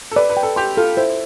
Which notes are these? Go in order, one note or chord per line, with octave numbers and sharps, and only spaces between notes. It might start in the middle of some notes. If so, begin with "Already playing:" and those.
A4
B4 D5
B4
G5
A4
G4 C6
F4 A4
E4 C5